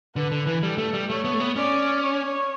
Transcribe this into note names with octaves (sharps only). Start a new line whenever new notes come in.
D3 B4
D3
E3
G3 A4
A3
G3
A3 C#5
B3
A3
B3
C#4 D5
C#5